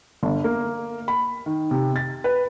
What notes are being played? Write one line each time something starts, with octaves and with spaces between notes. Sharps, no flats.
G1
A#3
B5
D#3
C3
A6
B4